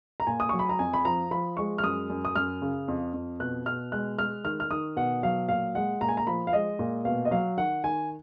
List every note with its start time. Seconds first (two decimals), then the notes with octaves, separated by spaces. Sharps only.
0.20 A#5
0.27 A#2 G#5
0.40 D#6
0.49 F#3 C#6
0.59 B5
0.69 A#5
0.79 F2 G#5
0.93 B5
1.05 F3 A#5
1.31 F3 B5
1.57 G#3 C#6
1.78 F6
1.83 F#2 D#6
2.10 F#2
2.25 D#6
2.35 F#2 F6
2.62 C#3
2.88 F2
3.14 F2
3.40 B2 F#6
3.66 B2 F6
3.92 G#3 F#6
4.18 G#3 F6
4.44 D#3 F6
4.60 F6
4.70 D#3 D#6
4.97 B2 F#5
5.23 F#3 F5
5.49 A#2 F5
5.75 G#3 F#5
6.01 A#2 A#5
6.09 G#5
6.17 A#5
6.27 F3 B5
6.47 F5
6.53 G#3 D#5
6.79 A#2
7.05 B2 F5
7.25 D#5
7.31 F#3 F5
7.57 D#3 F#5
7.84 D#3 G#5